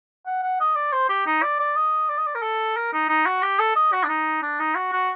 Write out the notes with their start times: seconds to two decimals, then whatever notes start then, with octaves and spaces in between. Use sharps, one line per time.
0.26 F#5
0.43 F#5
0.60 D#5
0.76 D5
0.92 C5
1.10 G4
1.27 D#4
1.43 D5
1.60 D5
1.76 D#5
2.09 D5
2.18 D#5
2.27 D5
2.35 A#4
2.42 A4
2.76 A#4
2.93 D#4
3.09 D#4
3.26 F#4
3.42 G4
3.59 A4
3.76 D#5
3.93 F#4
4.04 D4
4.09 D#4
4.42 D4
4.60 D#4
4.75 F#4
4.93 F#4